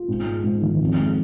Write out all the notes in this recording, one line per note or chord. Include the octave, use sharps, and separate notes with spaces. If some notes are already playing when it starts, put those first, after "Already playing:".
Already playing: F4
G#2
G#3
G#2
D#3
F2
G#3